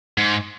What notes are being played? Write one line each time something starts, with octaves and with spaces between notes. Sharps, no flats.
G#2